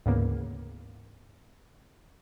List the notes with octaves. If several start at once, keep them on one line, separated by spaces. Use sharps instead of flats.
D2 G#2 C#3 E3 A#3 B3